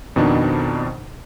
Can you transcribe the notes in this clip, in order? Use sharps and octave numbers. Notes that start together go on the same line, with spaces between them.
F2 B2 D#3 D4 D#4